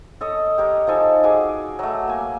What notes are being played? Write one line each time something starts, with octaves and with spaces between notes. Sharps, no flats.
A4 C#5 D#5
G4 A#4 C#5
F3 D#4 A4 G#5
F#4 G#4 G#5 D6
F#3 A3
A#3 G#5